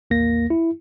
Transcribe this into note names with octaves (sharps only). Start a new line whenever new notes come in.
A1 D#2 A#3 A#6
E4